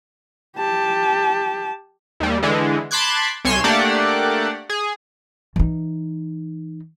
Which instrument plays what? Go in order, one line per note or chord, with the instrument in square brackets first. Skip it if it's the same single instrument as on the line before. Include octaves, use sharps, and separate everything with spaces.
[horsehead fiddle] G4 A5
[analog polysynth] D#2 G3
D3 E3 G#3
A5 B5 C6 D6 F#6 G#6
C2 C#5 G#5 C6 E7
A3 A#3 D4 G4 D5 F#5
G#4
[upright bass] E3 D#4